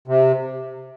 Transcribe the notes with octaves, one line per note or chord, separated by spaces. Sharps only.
C3